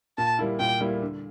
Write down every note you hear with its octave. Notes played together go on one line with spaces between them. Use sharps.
A#2 A5
G3 A#3 E4
A#2 G5
G3 A#3 E4
D3